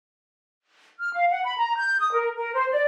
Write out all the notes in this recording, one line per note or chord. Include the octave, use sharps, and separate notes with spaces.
F6
F5
F#5
B5
A#5
G6
D#6
A#4
A#4
C5
D5